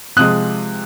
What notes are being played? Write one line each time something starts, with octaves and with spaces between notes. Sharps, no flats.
C3 F3 G#3 D#6 F#6